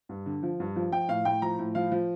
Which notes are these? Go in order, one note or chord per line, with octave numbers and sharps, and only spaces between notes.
G2
D3
F3
G2
F3
F3 G5
A2 F5
A2 G5
F3 A#5
A2
F3 F5
F3